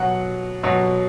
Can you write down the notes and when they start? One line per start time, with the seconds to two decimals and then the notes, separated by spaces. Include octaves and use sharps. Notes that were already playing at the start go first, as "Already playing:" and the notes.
Already playing: B2 F#3 F#5
0.63 B2 F#3